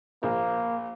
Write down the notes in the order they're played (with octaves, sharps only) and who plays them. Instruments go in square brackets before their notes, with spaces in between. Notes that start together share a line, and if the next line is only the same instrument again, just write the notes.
[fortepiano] A#1 [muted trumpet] A#3